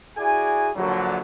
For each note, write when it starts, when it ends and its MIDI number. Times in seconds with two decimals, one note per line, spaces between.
0.17 0.69 64
0.17 0.69 66
0.17 0.69 68
0.17 0.69 74
0.17 0.69 80
0.76 1.20 34
0.76 1.20 50
0.76 1.20 54